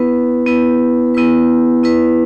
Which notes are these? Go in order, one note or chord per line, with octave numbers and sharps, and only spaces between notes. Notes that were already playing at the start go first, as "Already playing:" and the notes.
Already playing: B3 E4 B4
B3 E4 B4
B3 E4 B4
B3 E4 B4